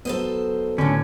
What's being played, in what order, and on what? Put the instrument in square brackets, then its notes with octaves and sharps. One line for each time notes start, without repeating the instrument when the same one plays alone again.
[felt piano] F#3 B3 [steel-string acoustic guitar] A4 C5 D#5
[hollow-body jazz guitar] A2 D3 [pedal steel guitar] C#4